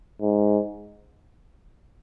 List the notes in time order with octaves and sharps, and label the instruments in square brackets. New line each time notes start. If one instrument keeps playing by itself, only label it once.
[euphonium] G#2